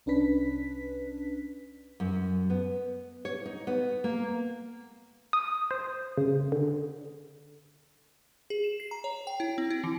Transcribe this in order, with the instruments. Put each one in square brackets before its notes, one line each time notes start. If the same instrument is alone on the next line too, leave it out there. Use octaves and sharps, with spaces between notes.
[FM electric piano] C2 C#4 D4 B4 B6
[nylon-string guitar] F#2
B3
C#5
D#4
B3
A#3
[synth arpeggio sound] D#6
C5
C#3
D3
[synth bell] G#4
E7
C7
A#5
C#5
G5
E4
C4
E4
E3